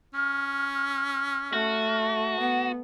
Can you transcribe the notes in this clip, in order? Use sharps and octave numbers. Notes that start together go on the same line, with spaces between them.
C#4 F6
A3 F#4
B3 F#5